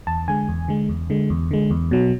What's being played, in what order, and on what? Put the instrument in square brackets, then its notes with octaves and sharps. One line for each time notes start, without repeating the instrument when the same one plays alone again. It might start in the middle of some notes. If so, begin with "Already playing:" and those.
[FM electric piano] E2 A5
D3 G#3 G#5
E2
D3 G#3
E2
D3 G#3
E2
D3 G#3
E2
B2 F#3